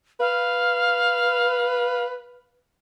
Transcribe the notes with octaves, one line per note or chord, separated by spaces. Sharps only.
B4 F5